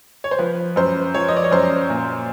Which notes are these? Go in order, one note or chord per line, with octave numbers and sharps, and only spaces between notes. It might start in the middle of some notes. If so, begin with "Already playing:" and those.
C#5
C5
F3 B4
F#2 C5
F3 C#5
D#5
D5
C#5
F#2 C5
A#2